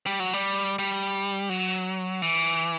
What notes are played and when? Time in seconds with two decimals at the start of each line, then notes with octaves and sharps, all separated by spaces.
0.06 G3
0.20 F#3
0.33 G3
0.79 G3
1.49 F#3
2.22 E3